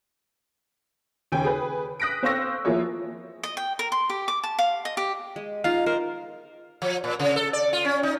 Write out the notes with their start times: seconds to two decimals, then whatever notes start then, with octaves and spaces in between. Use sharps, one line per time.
1.32 D#2 C#3 G5 G#5
1.44 G#4 B4
2.00 D#6 F#6 A#6 B6 D7
2.23 C4 C5 F5 C#6 E6 A#6
2.65 F3 A#3 E4 F4 G#4 C#5
3.43 D#5
3.57 G5
3.79 A#4
3.92 C6
4.10 G4
4.28 D6
4.43 A5
4.59 F5
4.85 D#5
4.97 G4
5.36 G#3
5.64 D#4 F4 F5
5.86 A#4 C5
6.82 F3
7.04 A#2
7.20 C#3
7.36 A4
7.53 D5
7.73 F4
7.85 C#4
8.03 D#4